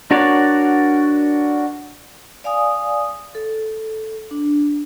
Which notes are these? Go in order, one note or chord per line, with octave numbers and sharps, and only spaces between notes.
D4 F#4 A#4 C#5 D5
D5 F5 G#5 D#6
A4
D4